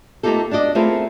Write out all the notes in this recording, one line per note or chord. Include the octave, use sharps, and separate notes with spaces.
A3 A#3 D#4 F4 G4 A4
D4 F#4 D5 D#5
A3 C4 E4 F4 G#4 A#4